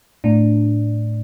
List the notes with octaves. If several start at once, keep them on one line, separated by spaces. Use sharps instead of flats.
A2 D4